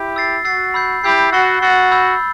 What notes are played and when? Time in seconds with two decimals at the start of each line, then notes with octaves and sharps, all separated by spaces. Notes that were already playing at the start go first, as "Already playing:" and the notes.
Already playing: E4 G4
0.16 E6 A6 C7
0.45 F#4 E6 A6 C7
0.74 B5 E6 G6 C7
1.03 E4 G4 B5 E6 G6 C7
1.32 F#4 E6 A6 C7 G7
1.62 F#4 E6 A6 C7 G7
1.91 B5 E6 G6